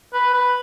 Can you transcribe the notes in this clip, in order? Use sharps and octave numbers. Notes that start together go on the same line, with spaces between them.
B4
B4